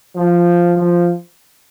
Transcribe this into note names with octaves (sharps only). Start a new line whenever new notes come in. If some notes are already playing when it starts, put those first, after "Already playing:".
F3
F3